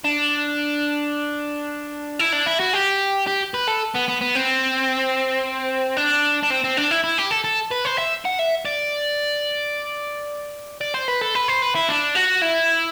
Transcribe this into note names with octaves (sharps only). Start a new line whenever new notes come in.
D4
E4
D4
E4
F#4
G4
G4
B4
A4
B3
B3
B3
C4
D4
D4
C4
C4
D4
E4
E4
G4
A4
A4
B4
C5
E5
F#5
E5
D5
D5
C5
B4
A4
B4
C5
B4
E4
D4
F#4
E4